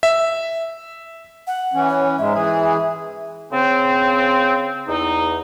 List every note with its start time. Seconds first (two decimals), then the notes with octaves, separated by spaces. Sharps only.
0.03 E5
1.47 F#5
1.73 E3 C#4
1.89 C#5
2.19 G#2 G#3 E5
2.34 E3 G#4
3.52 C#3 C4
4.88 E2 D#4